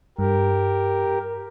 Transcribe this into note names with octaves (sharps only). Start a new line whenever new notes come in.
G2 G4 A#4